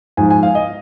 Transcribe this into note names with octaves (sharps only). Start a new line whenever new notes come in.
G#2 F3 G#5
G#5
F5
D#5